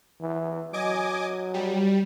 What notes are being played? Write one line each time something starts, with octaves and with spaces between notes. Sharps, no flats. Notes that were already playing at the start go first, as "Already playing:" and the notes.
E3
F#3 D#5 G#5 D6
G3